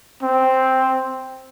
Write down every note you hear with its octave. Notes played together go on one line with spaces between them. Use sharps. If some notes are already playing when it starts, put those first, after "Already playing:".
C4